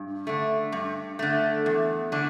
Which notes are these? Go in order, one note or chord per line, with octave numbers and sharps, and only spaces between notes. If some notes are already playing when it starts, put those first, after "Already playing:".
Already playing: G2
D3 A3
G2
D3 A3
E2
D3 A3 D4